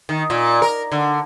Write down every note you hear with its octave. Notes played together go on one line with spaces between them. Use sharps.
D#3
A#2
A#4
D3